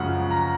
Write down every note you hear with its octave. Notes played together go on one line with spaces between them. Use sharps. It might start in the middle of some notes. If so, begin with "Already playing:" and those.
Already playing: F#2 C#3 F3 G#3 F#5
A#5